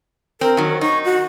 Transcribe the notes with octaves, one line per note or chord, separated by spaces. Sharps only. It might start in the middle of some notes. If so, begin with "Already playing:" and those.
C4 A#4
D#3 F#3
D#4 C#6
F#4